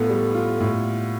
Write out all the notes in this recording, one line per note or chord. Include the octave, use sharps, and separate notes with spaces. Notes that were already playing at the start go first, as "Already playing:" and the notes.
Already playing: A2 B3 F4 A4
G3
F4
A2